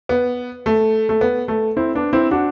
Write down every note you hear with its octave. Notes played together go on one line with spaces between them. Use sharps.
B3
A3
A3
B3
A3
C4 E4
B3 D4
C4 E4
D4 F#4